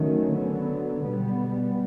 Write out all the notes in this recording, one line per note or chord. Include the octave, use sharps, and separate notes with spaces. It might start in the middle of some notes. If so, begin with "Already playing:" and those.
Already playing: D#3 F#3 A3 C#4
D3 F#3 B3
B2 G3 B3